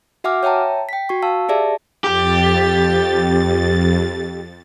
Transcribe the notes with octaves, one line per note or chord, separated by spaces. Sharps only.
F#4 E5 F#5 G#5 D6 F6
C#5 E5 G5 A5 A#5
G5 B6
F#4 C#6
F5 A5 E6
G4 G#4 D5 E5 A5
F2 G4 A6